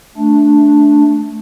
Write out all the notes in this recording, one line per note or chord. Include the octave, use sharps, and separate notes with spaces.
A3 D4